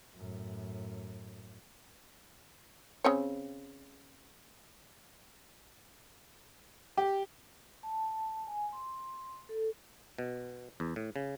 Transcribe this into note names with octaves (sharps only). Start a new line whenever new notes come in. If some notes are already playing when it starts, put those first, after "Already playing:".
F#2 A2
C#3 C4 C#5
G4
A5
G#5
C6
A4
B2
E2
A2
C#3